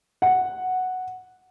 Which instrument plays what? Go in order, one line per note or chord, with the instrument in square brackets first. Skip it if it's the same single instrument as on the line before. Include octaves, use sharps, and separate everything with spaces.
[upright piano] F#5